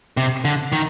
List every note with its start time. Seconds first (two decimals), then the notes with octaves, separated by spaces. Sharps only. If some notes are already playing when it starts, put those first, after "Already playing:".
0.17 C3
0.45 D3
0.72 D#3